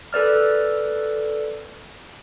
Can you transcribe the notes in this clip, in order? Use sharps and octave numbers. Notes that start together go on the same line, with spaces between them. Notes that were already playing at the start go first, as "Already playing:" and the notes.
A4 B4 D5 F6